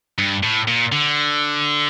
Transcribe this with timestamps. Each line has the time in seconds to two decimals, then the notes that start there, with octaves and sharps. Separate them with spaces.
0.18 G2
0.43 A2
0.68 A#2
0.92 D3